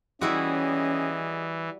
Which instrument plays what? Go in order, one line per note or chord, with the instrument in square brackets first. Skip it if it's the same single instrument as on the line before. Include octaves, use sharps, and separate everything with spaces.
[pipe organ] E3 [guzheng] G3 E4 F#4 [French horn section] C#4 [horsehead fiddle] G#4 D#5